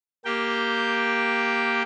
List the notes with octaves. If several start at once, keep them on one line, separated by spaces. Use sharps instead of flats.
A#3 G4 G5